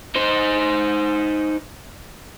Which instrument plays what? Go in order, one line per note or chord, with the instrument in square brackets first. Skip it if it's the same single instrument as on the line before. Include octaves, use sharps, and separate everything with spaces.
[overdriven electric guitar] D#4 C5